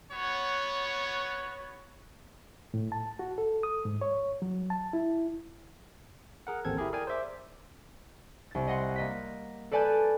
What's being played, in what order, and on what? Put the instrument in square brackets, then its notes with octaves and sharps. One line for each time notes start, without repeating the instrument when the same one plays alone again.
[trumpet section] B3 F#4 C#5
[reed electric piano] A2
A5
F#4
A4
D#6
G#2
C#5
F#3
A5
E4
[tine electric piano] G#4 A#4 F#5
A1 D#2 C4 A4 G#6
E4 G4 G#4 A#4
G#4 A#4 D5 G5 G#5
C5 D5 E5 D6
[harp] C2 A6
D#5 F#5 C6
A#3 D#5 B6
A4 B4 D5 G#5 A5 G6